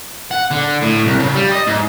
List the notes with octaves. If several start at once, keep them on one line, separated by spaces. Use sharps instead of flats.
F#5
D3
A2
C2
C#3
G3
D#5
G#2